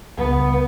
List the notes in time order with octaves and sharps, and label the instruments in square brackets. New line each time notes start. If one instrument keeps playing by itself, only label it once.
[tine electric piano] C#2 C#3 G3 [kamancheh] B3